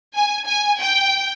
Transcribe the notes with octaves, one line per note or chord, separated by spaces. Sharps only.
G#5
G#5
G5